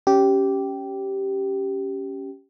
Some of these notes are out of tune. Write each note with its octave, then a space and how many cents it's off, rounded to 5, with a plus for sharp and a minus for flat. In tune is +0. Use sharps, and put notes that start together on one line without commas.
C#4 +0 G4 -10